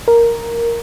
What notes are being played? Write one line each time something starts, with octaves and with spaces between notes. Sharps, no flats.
A#4